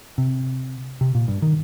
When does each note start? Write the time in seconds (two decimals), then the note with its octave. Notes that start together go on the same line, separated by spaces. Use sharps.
0.18 C3
1.01 C3
1.15 A#2
1.28 G2
1.42 D#3